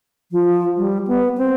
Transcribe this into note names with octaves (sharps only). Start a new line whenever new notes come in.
F3
G3
B3
C4